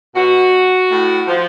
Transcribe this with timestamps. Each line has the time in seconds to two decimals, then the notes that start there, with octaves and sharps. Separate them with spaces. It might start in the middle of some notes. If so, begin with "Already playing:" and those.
0.15 B2 F#4
0.91 A2
1.28 F3